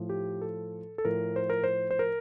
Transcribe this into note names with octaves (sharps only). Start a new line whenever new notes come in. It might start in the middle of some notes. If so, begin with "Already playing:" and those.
Already playing: A2 F3
G4
A4
A4
A2 F3 A#4
C5
A#4
C5
C5
A#4